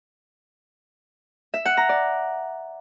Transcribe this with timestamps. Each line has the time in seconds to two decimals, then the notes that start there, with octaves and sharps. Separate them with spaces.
1.54 E5
1.65 F#5
1.77 A#5
1.89 D5